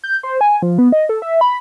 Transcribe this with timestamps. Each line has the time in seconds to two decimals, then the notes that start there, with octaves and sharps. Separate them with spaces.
0.04 G6
0.23 C5
0.41 G#5
0.62 F3
0.78 B3
0.92 D#5
1.09 A4
1.22 E5
1.41 B5